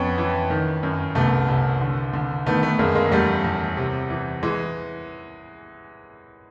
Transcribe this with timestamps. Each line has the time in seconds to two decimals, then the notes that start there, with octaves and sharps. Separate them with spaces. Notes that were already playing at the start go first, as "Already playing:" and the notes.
Already playing: F2 B3 C#4
0.18 E3
0.50 D#3
0.83 F#2
1.15 C2 A3 B3
1.48 C2
1.81 D3
2.13 D3
2.46 D#3 A3 B3
2.63 A3 B3
2.79 F#2 G#3 A#3
2.95 G#3 A#3
3.12 E2 G3 A3
3.45 E2
3.77 C3
4.10 E3
4.43 E3 G#3